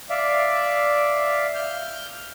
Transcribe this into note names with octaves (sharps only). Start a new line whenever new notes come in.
D5 E5 F5
F6 G6